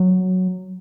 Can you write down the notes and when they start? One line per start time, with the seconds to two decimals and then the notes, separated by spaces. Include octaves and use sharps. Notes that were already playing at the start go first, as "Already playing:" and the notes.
Already playing: F#3